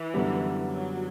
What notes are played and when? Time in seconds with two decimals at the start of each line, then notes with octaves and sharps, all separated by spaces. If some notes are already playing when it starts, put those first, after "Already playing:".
Already playing: E3
0.14 F#2 D3 G3 B3
0.70 F#3